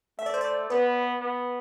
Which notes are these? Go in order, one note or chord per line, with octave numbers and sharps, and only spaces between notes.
A3 E5
D5
C5
D5
B3 B4
B3